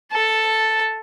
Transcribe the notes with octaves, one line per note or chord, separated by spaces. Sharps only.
A4 A5